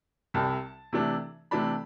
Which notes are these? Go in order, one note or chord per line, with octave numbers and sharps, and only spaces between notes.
C2 C3 G3 A5
C3 E3 A3 D4
C3 E3 A3 D4 B5